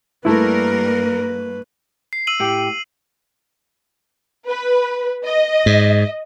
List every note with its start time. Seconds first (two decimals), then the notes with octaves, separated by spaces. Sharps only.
0.25 G2 G3 A3 A#3 E4 A#4 B4
2.13 C7
2.27 E6 D#7 F#7
2.40 A2 G4 G5
4.48 B4
5.25 D#5
5.66 G#2